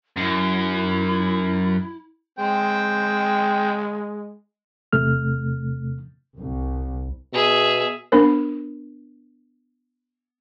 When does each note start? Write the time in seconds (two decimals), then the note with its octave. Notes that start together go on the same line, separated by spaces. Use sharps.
0.17 F#2 E4
2.39 G#3 C4 G5
4.93 E2 C3 A3 F6
6.37 C2
7.33 B2 G#4 E5
8.12 B3 D4 A#4 C5